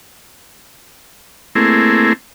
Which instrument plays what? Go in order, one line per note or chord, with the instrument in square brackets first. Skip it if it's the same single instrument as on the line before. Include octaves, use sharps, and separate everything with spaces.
[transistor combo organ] A3 A#3 C4 E4 G#4